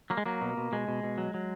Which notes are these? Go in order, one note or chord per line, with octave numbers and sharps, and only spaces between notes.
F#3 A#3
G#3
F#3 A#3
B2
B2
B2 G#3
B2
B2
F#3
F#3